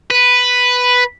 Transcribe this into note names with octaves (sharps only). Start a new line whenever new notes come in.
B4